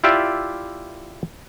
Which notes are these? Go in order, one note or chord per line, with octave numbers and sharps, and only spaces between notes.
E4 F4 G4 D5 E5